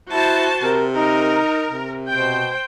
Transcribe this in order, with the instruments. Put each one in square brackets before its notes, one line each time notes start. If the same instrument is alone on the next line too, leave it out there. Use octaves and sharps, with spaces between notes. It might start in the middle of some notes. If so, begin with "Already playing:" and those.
[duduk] E4 [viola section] F#4 C5 A5
[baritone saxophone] C3 [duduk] A#4
[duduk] D#4 [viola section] A#4
[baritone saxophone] C3
[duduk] B2 [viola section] C5 G5